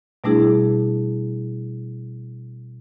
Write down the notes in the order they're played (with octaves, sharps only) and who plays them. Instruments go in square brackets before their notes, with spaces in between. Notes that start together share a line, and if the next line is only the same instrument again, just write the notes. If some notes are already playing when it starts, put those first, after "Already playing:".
[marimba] B2 G3 A3 D4 E4 G#4